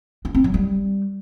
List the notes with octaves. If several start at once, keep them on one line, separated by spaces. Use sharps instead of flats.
D4
C4
F#3
G3